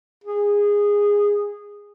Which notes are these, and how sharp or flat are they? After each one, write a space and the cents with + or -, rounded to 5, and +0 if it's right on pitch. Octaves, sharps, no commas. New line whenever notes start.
G#4 -15